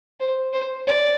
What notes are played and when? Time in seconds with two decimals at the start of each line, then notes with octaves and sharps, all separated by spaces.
0.20 C5
0.53 C5
0.87 D5